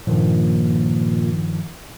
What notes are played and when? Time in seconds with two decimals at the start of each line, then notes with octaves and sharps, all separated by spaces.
0.07 G2 A#2 D#3 F3